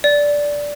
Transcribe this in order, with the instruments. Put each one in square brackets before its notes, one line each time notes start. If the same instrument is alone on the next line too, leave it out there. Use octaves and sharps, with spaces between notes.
[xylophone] D5